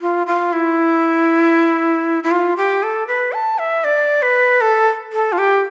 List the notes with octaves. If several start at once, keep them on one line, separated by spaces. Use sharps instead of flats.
F4
F4
E4
E4
F4
G4
A4
B4
A5
E5
D5
B4
A4
A4
F4
G4